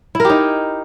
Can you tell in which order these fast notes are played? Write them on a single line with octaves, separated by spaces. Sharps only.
E4 A#4 G4 D#4